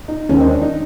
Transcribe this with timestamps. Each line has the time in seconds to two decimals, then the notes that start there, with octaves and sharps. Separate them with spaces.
0.08 D#4
0.29 D#2 D#3 G#3 C4 C#4
0.41 D#4
0.46 D4
0.62 D#4